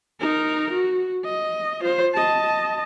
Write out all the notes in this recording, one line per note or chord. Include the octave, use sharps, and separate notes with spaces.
D#4 A#4
F#4
D#5
F4 C5
D#5 A5